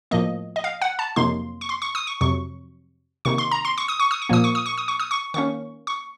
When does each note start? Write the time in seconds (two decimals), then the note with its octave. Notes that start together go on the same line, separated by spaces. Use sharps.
0.11 A2 F3 A#3 D#5
0.56 D#5
0.64 F5
0.82 F#5
0.99 A5
1.16 F2 C3 F#3 A#3 D#4 C6
1.61 C#6
1.69 C6
1.82 C#6
1.95 D#6
2.07 C#6
2.21 F2 C3 F#3 C#6
3.25 C3 D#3 A#3 D#4 C#6
3.38 C6
3.51 A#5
3.65 C6
3.78 C#6
3.88 D#6
4.00 C#6
4.11 D#6
4.22 C#6
4.29 A#2 F3 A#3 D#6
4.44 C#6
4.55 D#6
4.66 C#6
4.78 D#6
4.88 C#6
5.00 D#6
5.11 C#6
5.34 D#3 A#3 C#4 C#6
5.87 C#6